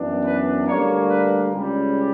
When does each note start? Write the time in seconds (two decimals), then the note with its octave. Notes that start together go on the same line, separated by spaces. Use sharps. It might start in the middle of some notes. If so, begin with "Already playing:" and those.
Already playing: F#2 E3 B3 D4
0.26 B4
0.67 D2 D3 G3 A#3 C#5
1.10 B4
1.52 C#2 C#3 G3